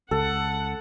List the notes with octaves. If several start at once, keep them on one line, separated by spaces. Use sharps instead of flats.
C#2 A4 F#5